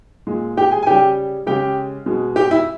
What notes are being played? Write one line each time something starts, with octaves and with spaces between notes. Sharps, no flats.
A#2 G#3
G4 G5
G#4 G#5
G#5
C#3 G3 G4 G5
C#3 G#3 G4 G5
B2 G#3
G4 G5
E4 E5